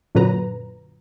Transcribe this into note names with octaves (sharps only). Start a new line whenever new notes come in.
F#2 A#2 D3 F#3 B4 A#5